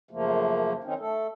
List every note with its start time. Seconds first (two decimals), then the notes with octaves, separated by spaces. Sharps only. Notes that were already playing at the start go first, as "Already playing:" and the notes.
0.11 F#2 C#3 F3 A3 A#3
0.84 D#3 C4 C#4 D#4
0.99 A3 A4